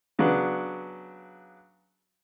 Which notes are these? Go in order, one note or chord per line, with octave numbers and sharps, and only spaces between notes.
C#3 F#3 B3 D4